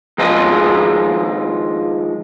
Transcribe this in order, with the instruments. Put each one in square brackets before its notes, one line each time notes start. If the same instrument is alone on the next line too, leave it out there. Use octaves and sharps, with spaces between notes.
[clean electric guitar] D#3 F3 G#3 F4 G#4 D#5